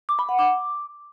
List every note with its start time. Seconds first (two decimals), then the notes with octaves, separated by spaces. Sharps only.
0.09 D6
0.19 B5
0.29 F#5
0.39 D6